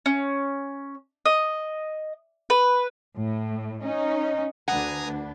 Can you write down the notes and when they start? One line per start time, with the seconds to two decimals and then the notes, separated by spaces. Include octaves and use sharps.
0.06 C#4
1.26 D#5
2.50 B4
3.16 A2
3.81 C#4 D#4
4.68 D2 D4 B4 F#5 G#5 A#5 D#6